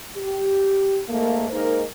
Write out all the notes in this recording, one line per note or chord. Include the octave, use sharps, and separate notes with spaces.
G4
G#2 A3 A#3
G#3 A#3 D#4 A#4 C5